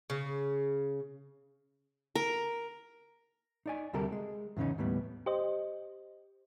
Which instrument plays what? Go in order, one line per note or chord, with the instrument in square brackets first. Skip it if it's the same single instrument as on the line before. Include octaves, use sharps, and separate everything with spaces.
[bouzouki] C#3
[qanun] A#4
[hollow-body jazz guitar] D#4 D5 G#5
D2 C3 G3 G4 A4 A#4
G#3
E2 G#2 C#3 C#4 D#4
D#2 A2 G3 B3
[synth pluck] G4 C5 D#5